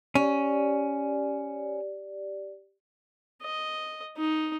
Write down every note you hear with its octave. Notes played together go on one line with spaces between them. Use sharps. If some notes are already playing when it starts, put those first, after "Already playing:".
C#4 G4 D5
D#5
D#4